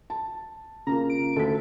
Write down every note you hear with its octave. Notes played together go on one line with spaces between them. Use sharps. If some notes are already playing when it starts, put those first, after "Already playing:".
A5
C#3 A#3 F4 A#5
D7
D2 A4 B6